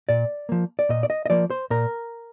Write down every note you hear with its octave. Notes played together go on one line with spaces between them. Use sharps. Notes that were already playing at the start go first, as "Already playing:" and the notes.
A#2 D5
F3 A#3
D5
A#2 D#5
D5
D#5
D#5
F3 A#3 D5
C5
A#2 A#4